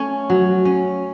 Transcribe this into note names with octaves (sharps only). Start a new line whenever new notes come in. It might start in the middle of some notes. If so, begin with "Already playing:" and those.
Already playing: A3 C#4
F#3
C#4